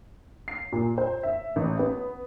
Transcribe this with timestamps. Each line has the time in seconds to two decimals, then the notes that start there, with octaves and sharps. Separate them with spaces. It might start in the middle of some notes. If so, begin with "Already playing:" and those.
0.48 C7
0.72 A#2
0.98 C5
1.23 E5
1.56 A1
1.79 B3